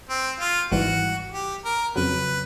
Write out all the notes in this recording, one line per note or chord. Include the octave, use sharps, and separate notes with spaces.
C4
F4
G#1 G#2 E3 G3 F#4
G4
A#4
F2 C#3 F#3 B4